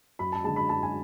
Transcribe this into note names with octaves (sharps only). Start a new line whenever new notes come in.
F#2 B5
A5
D3 G#3 A5
B5
F#2 A5
G#5